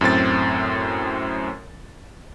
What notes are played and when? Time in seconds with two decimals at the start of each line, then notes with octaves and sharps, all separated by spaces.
0.01 F#2 A2 C4 A6